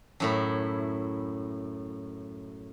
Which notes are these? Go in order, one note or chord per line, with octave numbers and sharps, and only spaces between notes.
F#2 A2 E4